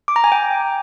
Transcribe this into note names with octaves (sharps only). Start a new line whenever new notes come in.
D6
A#5
G#5
G5